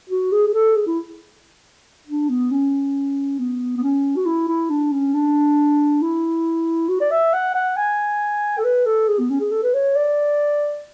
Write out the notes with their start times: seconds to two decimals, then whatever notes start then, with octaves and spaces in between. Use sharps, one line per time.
0.10 F#4
0.32 G#4
0.47 G#4
0.54 A4
0.76 G#4
0.87 E4
2.07 D4
2.29 B3
2.51 C#4
3.39 B3
3.77 B3
3.83 C#4
4.16 F#4
4.26 E4
4.48 E4
4.70 D4
4.92 C#4
5.14 D4
6.02 E4
6.89 F#4
7.01 D5
7.11 E5
7.33 F#5
7.54 F#5
7.77 G#5
8.58 A4
8.64 B4
8.86 A4
9.08 G#4
9.19 B3
9.30 C#4
9.40 G#4
9.52 A4
9.63 B4
9.74 C#5
9.96 D5